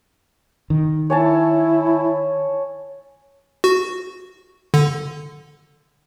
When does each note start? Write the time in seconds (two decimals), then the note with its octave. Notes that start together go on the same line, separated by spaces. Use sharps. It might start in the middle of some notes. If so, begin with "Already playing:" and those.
0.70 D#3
1.10 E4 C#5 G#5 A5
3.64 F#4
4.74 D3